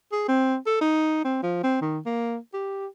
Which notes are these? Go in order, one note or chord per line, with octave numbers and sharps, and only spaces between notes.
G#4
C4
A4
D#4
C4
F3
C4
D#3
A#3
G4